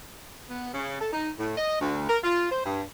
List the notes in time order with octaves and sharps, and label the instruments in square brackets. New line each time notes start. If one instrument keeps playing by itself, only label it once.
[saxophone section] B3
C#3
A4
D#4
A2
D#5
D2
A#4
F4
C5
G2